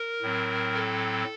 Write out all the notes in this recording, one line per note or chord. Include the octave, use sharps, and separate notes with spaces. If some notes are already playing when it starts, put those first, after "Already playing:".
Already playing: A#4
A2 F#3 C4
A4